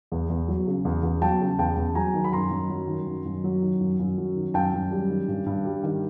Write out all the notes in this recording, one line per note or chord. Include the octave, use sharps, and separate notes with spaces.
E2
E2
F#3
C#3
E2
E2
F#3 G5 A5
C#3
E2 G5 A5
E2
F#3 G#5 A#5
D#3
B5
F#2 A#5 C6
F#2
F#3
D#3
F#2
F#2
F#3
D#3
F#2
F#2
F#3
D#3
F#2 G5 A5
F#2
G3
D#3
G2
G2
G3
D#3